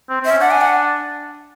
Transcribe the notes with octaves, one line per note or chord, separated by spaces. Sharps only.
C4
C4
E5
C#4
D4 F#5
G#5
F#5